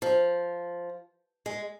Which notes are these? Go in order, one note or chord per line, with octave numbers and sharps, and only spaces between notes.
F3
G#3